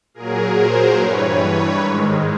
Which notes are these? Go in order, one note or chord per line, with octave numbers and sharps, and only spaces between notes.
A#2 F#3 G#4 A#4
A#4 C5
G2 E3 G3 B4 C#5
G#2 D#3 G#3